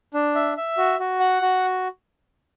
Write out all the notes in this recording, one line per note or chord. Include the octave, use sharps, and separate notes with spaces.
D4
E5
E5
F#4
F#4
F#5
F#4